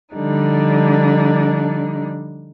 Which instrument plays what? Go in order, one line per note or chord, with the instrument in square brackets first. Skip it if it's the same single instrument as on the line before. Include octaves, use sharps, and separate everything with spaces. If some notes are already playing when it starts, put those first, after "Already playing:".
[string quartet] D3 F3 G3 D4 D#4